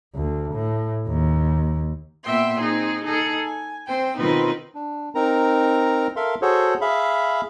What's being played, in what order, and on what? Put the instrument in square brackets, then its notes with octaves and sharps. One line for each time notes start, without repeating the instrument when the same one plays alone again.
[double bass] D2
A2
D#2
[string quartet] A#2 B3 E5 G5 C6
C4 D#4 G#4
D#4 G#4 A4
G#5
C4 C5 G5
B2 D#3 C4 D#4 F4 B4
[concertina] D4
C4 D#4 A#4 A#5
A4 A#4 E5 F5 C6
F#4 G#4 A4 C5 C#5
G#4 E5 F5 B5